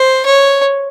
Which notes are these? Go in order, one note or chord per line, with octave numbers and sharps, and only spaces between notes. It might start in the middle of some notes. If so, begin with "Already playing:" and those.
Already playing: C5
C#5